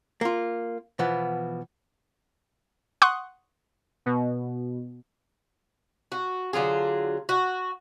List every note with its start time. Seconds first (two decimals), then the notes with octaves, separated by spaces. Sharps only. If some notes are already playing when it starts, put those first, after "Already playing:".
0.21 A#3 F4
0.99 B2 E3 F3 B3
3.02 F#5 C6 C#6 D#6 F#6
4.06 B2
6.12 F#4
6.53 D3 F#3 F4 G#4
7.29 F#4